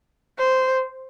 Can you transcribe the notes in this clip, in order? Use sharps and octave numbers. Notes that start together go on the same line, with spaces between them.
C5